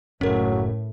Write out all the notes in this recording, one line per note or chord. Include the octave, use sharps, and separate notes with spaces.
F#1 A2 F#3 C#4 A#4